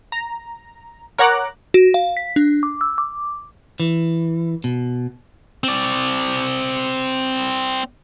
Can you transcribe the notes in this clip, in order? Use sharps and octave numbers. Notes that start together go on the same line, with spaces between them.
A#5
A#4 C#5 F#5 A#5 D6 F#6
F#4
F5
B6
D4
D6
E6
D6
E3
B2
C4 D5